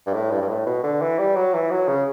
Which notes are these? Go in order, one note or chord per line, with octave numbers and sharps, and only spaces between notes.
G2
A2
G2
G2
A2
B2
D3
E3
G3
F#3
E3
F#3
C#3